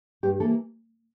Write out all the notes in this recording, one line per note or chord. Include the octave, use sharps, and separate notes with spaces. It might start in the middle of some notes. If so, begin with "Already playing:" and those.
G2 G4
E3 A#3 A4